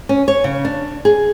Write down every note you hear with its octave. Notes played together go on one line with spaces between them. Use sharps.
C#4
C#5
C#3
D4
G#4